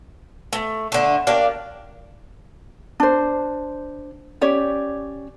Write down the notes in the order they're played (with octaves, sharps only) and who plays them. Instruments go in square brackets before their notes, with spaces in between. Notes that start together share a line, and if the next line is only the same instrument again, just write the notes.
[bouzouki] A3
D3 A3
A#3 D4 G4 F5
[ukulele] D4 C5
C#4 G4 C#5 D5